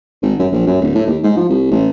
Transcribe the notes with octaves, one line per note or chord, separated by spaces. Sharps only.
G#1
F#2
A#1
F#2
D1
A2
D#2
G#2
F3
C2
A1